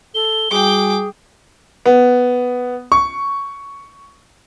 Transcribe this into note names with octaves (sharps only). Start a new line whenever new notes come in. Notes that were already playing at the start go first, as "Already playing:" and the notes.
A4 G7
G3 F#4 G#4 G5 G#5 D6
B3
C#6